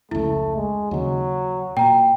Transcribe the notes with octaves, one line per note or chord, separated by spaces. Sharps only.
F1 C#2 A3 E4
G#3
D#2 C#3 F#3
A#2 G5 A#5